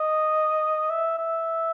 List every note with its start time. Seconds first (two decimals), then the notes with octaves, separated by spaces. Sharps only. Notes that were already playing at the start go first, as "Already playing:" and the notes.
Already playing: D#5
0.90 E5
1.18 E5